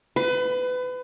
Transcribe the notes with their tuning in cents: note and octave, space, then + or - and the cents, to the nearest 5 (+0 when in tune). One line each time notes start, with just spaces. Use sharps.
B4 +30